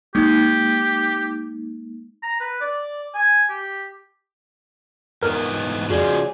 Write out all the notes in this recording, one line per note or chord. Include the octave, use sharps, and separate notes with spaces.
G#3 A#3 D#4 G4
A#5
B4
D5
G#5
G4
G#2 E3 B3 A#4
C#3 F3 G#3 F#4 G#4 D5